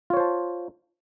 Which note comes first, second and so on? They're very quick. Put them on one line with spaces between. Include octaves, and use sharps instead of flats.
F4 C#5 C5 A5